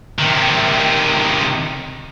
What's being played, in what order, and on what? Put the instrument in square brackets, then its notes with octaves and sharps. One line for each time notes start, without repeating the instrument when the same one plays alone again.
[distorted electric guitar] C3 D#3